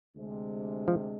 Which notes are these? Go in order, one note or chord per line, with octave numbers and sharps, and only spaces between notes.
D2 C3 G#3 D4
F3